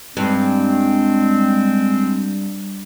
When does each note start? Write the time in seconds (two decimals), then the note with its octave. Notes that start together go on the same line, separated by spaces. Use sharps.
0.17 G2 G#3 C4